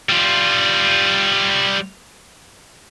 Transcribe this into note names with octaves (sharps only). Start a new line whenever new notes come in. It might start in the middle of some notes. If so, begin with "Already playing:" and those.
G3 F4